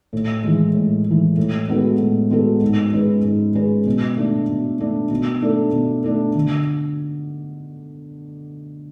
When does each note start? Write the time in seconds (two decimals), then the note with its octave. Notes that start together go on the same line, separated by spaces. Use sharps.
0.13 A2
0.44 E3 G#3
0.75 A2
1.06 E3 G#3
1.37 A2
1.68 G#3 B3 F#4 A4
2.00 A2
2.31 G#3 B3 F#4 A4
2.61 G#2
2.93 G#3 C#4 G#4 B4
3.24 G#2
3.55 G#3 C#4 G#4 B4
3.86 B2
4.17 A3 D4
4.49 B2
4.80 A3 D4
5.11 B2
5.42 A3 D4 A4
5.72 B2
6.04 A3 D4 A4
6.35 D3